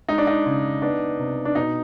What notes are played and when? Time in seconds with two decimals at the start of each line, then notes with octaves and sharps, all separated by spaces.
0.08 G#3 D#4
0.18 D4
0.27 D#4
0.46 C#3
0.82 B3 D4
1.19 C3
1.45 D4
1.55 B2 D#4